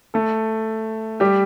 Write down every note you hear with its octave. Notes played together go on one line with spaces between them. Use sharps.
A3 A4
G3 G4